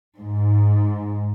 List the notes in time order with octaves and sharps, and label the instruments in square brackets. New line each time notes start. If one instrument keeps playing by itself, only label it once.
[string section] G#2